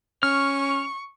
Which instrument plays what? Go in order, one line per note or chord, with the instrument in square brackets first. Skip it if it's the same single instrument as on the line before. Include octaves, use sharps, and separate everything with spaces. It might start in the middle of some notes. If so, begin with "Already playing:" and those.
[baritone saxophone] C#4 [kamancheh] C#6 [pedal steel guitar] F6